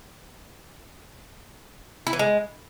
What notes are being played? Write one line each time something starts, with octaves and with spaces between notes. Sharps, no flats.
E4
E3
G#3